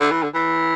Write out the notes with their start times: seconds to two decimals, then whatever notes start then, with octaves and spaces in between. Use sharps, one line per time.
0.01 D3
0.11 E3
0.23 D3
0.34 E3